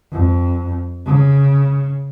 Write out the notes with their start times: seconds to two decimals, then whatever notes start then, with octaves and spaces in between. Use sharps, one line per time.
0.11 F2
1.06 C#3